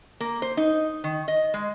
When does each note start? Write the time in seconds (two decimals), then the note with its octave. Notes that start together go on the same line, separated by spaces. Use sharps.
0.20 A#3
0.42 C5
0.57 D#4
1.04 D#3
1.28 D#5
1.54 G#3